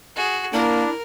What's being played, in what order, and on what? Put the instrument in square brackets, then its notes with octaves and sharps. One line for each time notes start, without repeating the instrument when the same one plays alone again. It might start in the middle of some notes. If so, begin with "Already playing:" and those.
[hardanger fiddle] F#4 G#4
[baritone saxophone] A#3 [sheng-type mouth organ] D4 [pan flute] E4 [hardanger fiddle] A#4